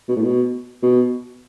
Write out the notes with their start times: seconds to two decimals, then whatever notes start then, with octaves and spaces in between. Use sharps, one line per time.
0.09 B2
0.16 A2
0.24 B2
0.83 B2